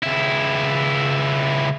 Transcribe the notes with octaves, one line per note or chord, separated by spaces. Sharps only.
C#2 E4